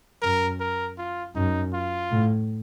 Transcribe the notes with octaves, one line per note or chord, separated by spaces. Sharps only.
F#2 A#4
A#4
F4
F#2 D#4
F4
A2